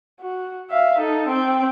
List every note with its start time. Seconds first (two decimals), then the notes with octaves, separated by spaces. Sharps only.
0.21 F#4
0.70 E5 F5
0.99 D#4 A4
1.29 C4 G5